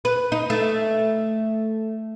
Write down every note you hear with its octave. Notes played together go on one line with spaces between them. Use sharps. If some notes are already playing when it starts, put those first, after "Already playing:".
B4
D#4
A3